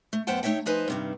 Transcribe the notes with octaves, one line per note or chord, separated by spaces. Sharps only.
A3
F#2 B3 C5 F#5 G5 A5
A3 D#4 C#5 E5 G5
F3 D#4 B4 C5 G#5
G2 C3 D#3